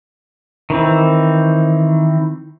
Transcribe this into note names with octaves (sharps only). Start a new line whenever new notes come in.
D#3 E3 C4